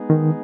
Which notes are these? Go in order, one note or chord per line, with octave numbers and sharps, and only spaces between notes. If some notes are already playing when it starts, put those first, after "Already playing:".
Already playing: G#3 B3 D#4 G#4
D#3